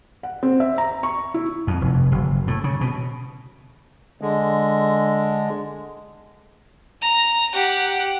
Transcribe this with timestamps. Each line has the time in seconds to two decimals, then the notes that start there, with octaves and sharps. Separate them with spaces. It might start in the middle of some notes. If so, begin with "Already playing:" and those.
0.23 F#5
0.43 C4
0.60 E5
0.78 A#5
1.03 C#6
1.34 E4
1.67 F2
1.81 F1
2.12 F#1
2.47 A2
2.64 C#3
2.81 B2
4.21 D3 G#3
7.02 A#5
7.54 G4 F#5